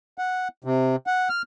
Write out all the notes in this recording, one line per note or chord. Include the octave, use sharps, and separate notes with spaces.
F#5
C3
F#5
F6